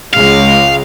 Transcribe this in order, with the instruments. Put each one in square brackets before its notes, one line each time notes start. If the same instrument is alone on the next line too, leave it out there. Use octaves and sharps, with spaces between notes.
[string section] C#2 G#3 [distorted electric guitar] F5